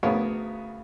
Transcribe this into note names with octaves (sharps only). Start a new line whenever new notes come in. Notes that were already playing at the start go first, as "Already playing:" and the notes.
D2 C#3 B3 A#4 C#5